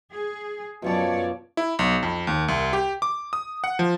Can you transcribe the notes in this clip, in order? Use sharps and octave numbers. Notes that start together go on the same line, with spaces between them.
G#4
F#2 B2 F3 C#5 D5 A5
E4
B1
F2
D#2
C2
G4
D6
D#6
F#5
F3